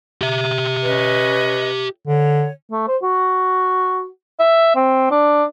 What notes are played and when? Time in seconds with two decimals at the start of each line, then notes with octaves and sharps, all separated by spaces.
0.22 G4 E5
0.83 C#4 B4 D#5
2.07 D3 C#5
2.71 A3
2.88 C5
3.03 F#4
4.39 E5
4.76 C4
5.11 D4